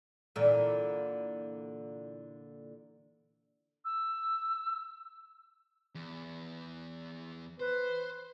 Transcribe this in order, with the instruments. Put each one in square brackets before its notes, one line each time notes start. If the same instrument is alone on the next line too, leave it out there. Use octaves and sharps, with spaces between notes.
[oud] A#2 D3 E3
[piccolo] E6
[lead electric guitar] E2
[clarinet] B4 [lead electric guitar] C5